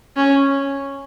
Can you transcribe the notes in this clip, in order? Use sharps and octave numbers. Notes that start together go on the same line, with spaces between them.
C#4